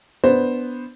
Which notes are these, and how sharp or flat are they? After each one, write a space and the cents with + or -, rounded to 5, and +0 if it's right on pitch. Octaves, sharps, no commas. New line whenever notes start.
B3 +0 D4 -10 C5 +0